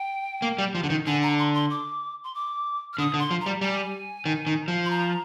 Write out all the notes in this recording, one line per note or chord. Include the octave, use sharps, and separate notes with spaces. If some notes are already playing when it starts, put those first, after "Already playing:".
Already playing: G5
A#3
G3
F3
D3
D#3
D3 G#5
A#5
C6
C6
D6
C6
D6
F6
D3 D#6
D3
C6
F3
A#5
G3
G3 G#5
D#3
D#3
F3
C6
A#5